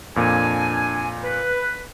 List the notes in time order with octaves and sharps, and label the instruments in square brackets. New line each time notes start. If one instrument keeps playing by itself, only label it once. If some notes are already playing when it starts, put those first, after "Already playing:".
[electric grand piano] F2 A#2 [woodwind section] D4 G#5
[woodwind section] B4